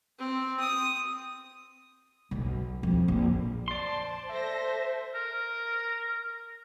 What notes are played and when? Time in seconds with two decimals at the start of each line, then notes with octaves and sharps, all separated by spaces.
0.19 C4
0.60 D#6
2.31 B1
2.83 F2
3.08 A#1
3.68 C5 D5 A5 C6 C7
4.29 A4 C5 E5 A#6
5.15 A#4